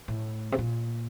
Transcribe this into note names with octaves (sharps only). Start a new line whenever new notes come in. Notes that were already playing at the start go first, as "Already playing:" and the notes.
A2
C3
A#2